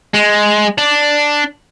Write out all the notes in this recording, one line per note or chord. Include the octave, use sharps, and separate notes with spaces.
G#3
D4